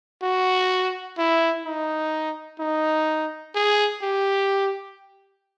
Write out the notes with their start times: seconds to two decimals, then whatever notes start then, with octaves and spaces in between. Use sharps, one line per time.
0.23 F#4
1.18 E4
1.65 D#4
2.60 D#4
3.55 G#4
4.02 G4